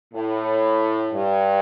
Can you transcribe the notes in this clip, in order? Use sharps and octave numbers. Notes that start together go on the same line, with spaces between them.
A2
G2